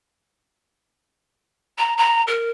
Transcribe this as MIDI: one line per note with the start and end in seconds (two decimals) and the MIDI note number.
1.78 1.94 82
1.97 2.22 82
2.27 2.49 70